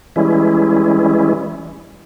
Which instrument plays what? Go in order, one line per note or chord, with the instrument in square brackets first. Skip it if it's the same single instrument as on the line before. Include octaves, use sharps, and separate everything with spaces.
[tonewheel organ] E3 G3 G#3 C#4 E4